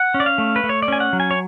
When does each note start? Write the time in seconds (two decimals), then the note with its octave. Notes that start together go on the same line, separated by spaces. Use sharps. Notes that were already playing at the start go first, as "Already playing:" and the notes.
Already playing: F#5
0.14 C#4
0.20 D5
0.26 F5
0.38 A3
0.56 B4
0.64 A3
0.69 C#5
0.82 D5
0.88 C#4 G#5
1.00 F#5
1.13 F#3
1.20 G#5
1.31 C#5